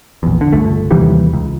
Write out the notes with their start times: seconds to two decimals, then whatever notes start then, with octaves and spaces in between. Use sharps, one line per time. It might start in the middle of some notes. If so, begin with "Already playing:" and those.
0.23 A#1 E2
0.41 D3
0.53 G1 C#2 A3
0.91 D#2 C3 E3 G3
1.33 C#2